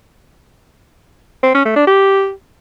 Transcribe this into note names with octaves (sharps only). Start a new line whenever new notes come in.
C4
C#4
A3
D4
G4